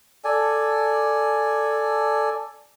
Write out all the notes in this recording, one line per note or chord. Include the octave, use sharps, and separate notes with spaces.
A4 D5 G#5